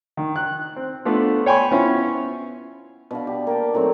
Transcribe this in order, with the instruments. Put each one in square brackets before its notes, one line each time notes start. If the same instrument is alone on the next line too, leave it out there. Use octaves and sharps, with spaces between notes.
[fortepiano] D#3
F#6
C4
A3 B3 D4 F4
C#5 G5 G#5 B5 C#6
B3 C#4 E4 F4 C5
[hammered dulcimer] B2 D4 F5
G4
A#3 G5 A5
D#3 F#3 A3 C4